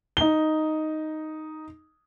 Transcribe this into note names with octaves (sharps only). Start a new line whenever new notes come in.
D#4 G7